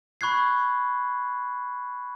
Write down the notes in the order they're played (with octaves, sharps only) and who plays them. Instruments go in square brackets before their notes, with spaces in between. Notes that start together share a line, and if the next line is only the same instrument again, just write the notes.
[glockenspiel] B5 C#6 F#6 G#6 C7